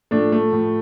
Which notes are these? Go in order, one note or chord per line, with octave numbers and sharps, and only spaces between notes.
A2 F3 A3 D4
A3
A2 F3